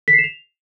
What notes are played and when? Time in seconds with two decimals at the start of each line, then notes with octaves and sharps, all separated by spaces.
0.08 B6
0.13 C7
0.18 E7
0.24 F7